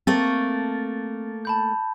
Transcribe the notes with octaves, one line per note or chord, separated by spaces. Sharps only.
A3 A#3 C4 A6
A5 B5 G6